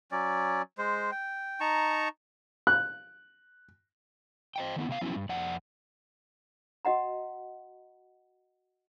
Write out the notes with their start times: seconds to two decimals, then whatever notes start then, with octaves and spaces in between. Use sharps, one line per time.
0.12 F#3 C#4 D5
0.78 G#3 C5
1.11 G5
1.60 D#4 A5 A#5 C#6
2.67 F#6
4.56 C5 D#5 G5
4.76 D#3 B3 E4
4.89 C3 B3 F5
5.01 F3 F#3 B3 C#4 E4
5.16 G2
5.29 F2 D5 F#5
6.85 F#4 D#5 F#5 A#5